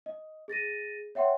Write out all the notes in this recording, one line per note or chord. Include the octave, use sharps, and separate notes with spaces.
D#5
G#4 A6 A#6 D#7
C#5 E5 F#5 G5 C6